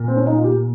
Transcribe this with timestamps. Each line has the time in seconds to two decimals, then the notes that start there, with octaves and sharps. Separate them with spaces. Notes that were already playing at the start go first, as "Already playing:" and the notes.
Already playing: A#2
0.08 C4
0.17 C#4
0.27 D#4
0.35 F4
0.44 G4